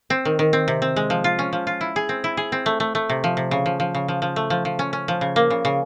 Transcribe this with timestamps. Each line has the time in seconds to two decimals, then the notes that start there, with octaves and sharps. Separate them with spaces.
0.10 C4
0.25 D#3
0.39 D#3
0.53 C4
0.68 C3
0.82 C4
0.96 G#3
1.10 F3
1.24 F4
1.39 C#4
1.53 F3
1.67 F4
1.81 E4
1.96 G#4
2.09 C4
2.24 E4
2.37 G#4
2.52 C4
2.66 A3
2.80 A3
2.95 A3
3.09 C3
3.24 F3
3.37 C3
3.51 C#3
3.66 F3
3.80 F3
3.95 C#3
4.08 F3
4.22 F3
4.36 A3
4.50 F3
4.65 F3
4.79 C#4
4.93 C#4
5.08 F3
5.21 C#3
5.36 A#3
5.50 C#3
5.65 C#3